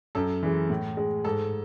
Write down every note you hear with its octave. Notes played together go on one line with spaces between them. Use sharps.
F#2 A4
E3 G#3
A2
G#3
G#2 A4